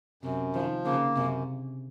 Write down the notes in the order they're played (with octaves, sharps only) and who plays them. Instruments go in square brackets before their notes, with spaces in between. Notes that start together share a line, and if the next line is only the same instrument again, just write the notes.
[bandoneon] F#2 [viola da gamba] C3
[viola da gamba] D#3 [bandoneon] F3
[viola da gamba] C#3 [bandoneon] A#3
[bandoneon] F#2 [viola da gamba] C3